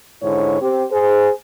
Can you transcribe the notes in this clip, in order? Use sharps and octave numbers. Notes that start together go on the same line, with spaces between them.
G#2 D3 E4 C#5
C4 G4
G#4 C5